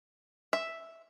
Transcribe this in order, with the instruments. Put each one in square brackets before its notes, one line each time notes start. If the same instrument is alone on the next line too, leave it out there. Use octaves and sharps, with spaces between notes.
[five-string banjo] E5